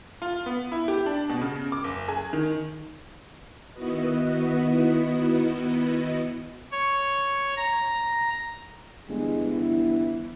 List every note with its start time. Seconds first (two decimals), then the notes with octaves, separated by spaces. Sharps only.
0.22 F4
0.46 B3
0.72 E4
0.88 G4
1.06 D4
1.29 B2
1.42 C#3
1.72 D6
1.84 F#1
2.08 G#4
2.33 D#3
3.73 D#3 B3 E4 F#4 B4 D#5
6.72 C#5
7.57 A#5
9.09 G1 E3 G#3
9.50 E4